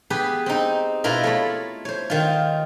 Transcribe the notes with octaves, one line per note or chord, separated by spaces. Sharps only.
B3 G4 G#4 B4
C4 D#4
B2 E4 F4 A#4
A3 C#5 B5
C5 C#5
D#3 F4